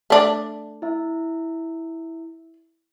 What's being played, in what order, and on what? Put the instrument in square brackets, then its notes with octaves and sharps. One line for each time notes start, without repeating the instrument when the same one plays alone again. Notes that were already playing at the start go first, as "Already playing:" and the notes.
[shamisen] A3 D4
[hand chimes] E4 E5